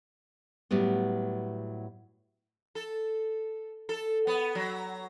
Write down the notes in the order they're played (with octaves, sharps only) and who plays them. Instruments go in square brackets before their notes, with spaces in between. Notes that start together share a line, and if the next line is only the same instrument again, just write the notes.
[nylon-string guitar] A2 F#3 G3 B3
[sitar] A4
A4
B3
F#3